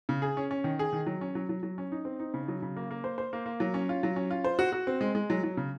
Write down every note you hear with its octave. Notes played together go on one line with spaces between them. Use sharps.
C#3
G#4
C#4
C#4
D#3
G#4
D#3
F#3
C#4
F#3
F#3
F#3
C#4
D#4
C4
D#4
C#3
F#3
C#3
A#3
A#3
C5
C5
A#3
A#3
F#3
C#4
F4
F#3
C#4
F4
C5
F#4
F#4
C4
G#3
G#3
F#3
F#3
C#3